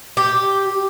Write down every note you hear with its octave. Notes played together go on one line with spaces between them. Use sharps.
G4